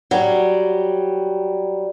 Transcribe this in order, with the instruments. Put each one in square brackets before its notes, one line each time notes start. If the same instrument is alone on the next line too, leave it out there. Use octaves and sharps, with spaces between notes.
[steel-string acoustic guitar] F#3 G3